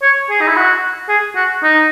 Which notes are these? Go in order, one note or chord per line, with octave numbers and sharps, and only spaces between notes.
C#5
G#4
D#4
E4
F#4
G#4
F#4
D#4